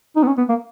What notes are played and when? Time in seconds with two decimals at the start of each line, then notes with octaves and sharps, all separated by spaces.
0.16 D#4
0.23 B3
0.27 C#4
0.38 B3
0.49 A#3